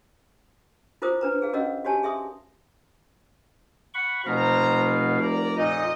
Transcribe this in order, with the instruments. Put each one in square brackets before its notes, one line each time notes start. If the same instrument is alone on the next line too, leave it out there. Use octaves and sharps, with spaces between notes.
[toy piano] E4 F4 A#4 C5 D6 D#6
D4 B4 A#5
G#4 F5
C#4 F#4 A#4 C#5 D#5 F5
F#4 G4 C#5 G#5 A5
G#4 E5 C6 D#6
[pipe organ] F#5 B5 C#6
[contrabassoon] F1 [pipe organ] B2 F5 [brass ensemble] C5 A#5
[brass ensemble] A#4 D5 A#5
[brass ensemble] F2 D#5 [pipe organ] A#2 D#4